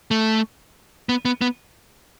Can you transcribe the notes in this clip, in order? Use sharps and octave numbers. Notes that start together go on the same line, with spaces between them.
A3
B3
B3
B3